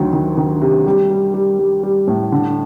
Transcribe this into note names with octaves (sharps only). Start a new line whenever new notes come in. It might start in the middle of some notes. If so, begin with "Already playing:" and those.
Already playing: D2 D#3 F#3
D#3
D#3
C3
G3
G3
G3
G3
G3
A2
D3